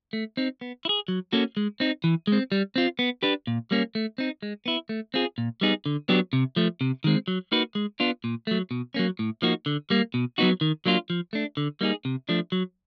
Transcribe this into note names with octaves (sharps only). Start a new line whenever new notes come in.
A3
C4 D#4
B3
E4
G#4
F#3
A#3 C#4 F#4 A4
G#3
C4 D#4
E3
G#3 C4
G3
C4 F4
B3
D4 G4 B4
A#2
G3 A#3 C#4
A3
C4 D#4
G#3
B3 E4
A3
C4 F4 G#4
A#2
G3 B3 D#4 G#4
D3
F#3 B3 D4 G4
C3
F3 A3
C3
D#3 G#3 C4
F#3
A#3 D#4 F#4 B4
G#3
B3 D4 F4
A#2
F#3 A3
B2
F#3 A#3 C#4
A2
F3 A#3 D#4 F#4
D3
G3 A#3
B2
F#3 B3 D#4 F#4
D#3
F#3 A#3 D4 F4
F3
A3 D4
D3
G3 A#3 D#4 G#4
C3
F3 A3 D4
F#3